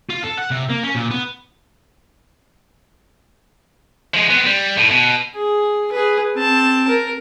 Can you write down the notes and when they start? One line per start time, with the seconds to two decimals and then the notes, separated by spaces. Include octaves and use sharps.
0.09 F4
0.23 A4
0.37 F#5
0.50 C3
0.69 A#3
0.83 C#4
0.95 A#2
1.10 B3
4.14 F3 G#3
4.30 B3 C4
4.46 G3
4.78 A2
4.91 B2
5.35 G#4
5.92 G#4 B4
6.35 C4 A5
6.89 A#4